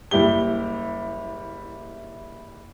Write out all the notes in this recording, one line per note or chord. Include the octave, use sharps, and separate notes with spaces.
F#1 G3 E4 G4 G7